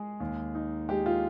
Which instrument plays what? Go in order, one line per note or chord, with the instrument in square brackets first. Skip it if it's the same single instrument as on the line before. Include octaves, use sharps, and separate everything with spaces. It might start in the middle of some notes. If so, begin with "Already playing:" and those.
Already playing: [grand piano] G#3 [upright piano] G#4
[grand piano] D#2
D#4
[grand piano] G#3 [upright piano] G4
[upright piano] F4